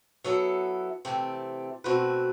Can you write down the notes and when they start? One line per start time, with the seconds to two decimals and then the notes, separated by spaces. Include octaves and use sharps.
0.24 F#3 B3 E4 A4 E5
1.05 C3 E3 A3 C4 G4
1.84 B2 A3 C4 F#4 B4